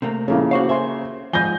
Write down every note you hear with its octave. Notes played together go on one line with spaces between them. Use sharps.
C3 A3 A#3
F2 A#2 C#3 A#3 E4 A4 C#5
F#4 C5 C#5 F5 C#6 D6
C5 E5 G#5 C6
G#2 F3 G#5 G6 A#6 G7